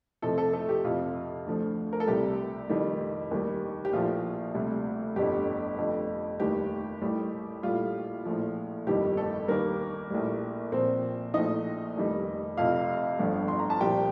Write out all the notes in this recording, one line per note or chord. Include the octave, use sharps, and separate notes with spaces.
F2 C3 F3 A3 A4
A3 A4
A3 A4
G4
F2 C3 F3 F4
D2 D3 F3
A#4
A4
C2 C3 G3 G4
F1 F2 D#3 G3
D#2 D#3 G3
G4
A#1 A2 F3 F4
D2 C3 G3
G1 F2 D3 G3 G4
F1 F2 D3
F1 D#2 D#3 G3 G4
A1 A2 G3
A#1 A2 G3 F4
A#1 A2 F3
G1 F2 D#3 G3 G4
A3 A4
D#2 D#3 G3 A#3 A#4
A#1 A2 G3
A#1 A#2 F3 C4 C5
A#1 A2 F3 D#4 D#5
F1 F2 D#3 G3
F1 F2 C3 F4 F5
G1 G2 D3 F3
C6
A#5
A5
C2 A#2 F3 G4 G5